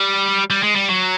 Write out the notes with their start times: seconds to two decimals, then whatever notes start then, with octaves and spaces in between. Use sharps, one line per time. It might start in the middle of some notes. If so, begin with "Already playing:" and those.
Already playing: G3
0.50 G3
0.63 G#3
0.76 G3
0.89 F#3